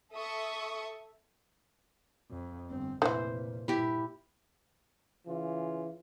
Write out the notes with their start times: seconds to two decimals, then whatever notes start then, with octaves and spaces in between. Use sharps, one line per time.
0.14 A4 E5 C#6 D#6
2.31 F2
2.69 G1 C4
3.02 F1 A#2 D#3 E3 C5
3.68 G2 A#2 E4 G4
5.27 C#3 E3 F4